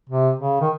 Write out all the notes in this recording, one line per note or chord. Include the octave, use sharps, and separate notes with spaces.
C3
C#3
D#3